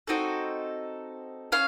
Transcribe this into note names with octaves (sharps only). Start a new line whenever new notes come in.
C4 D#4 F#4 A4
C#4 F5